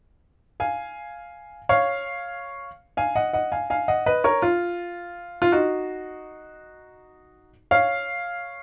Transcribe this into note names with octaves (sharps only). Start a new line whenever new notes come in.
F5 G#5
C#5 F5
F5 G#5
D#5 F#5
D#5 F#5
F5 G#5
F5 G#5
D#5 F#5
B4 D#5
A#4 C#5
F4
F4
D#4 F#4
C#5 F5